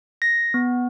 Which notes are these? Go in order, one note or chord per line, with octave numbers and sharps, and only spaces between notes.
A#6
B3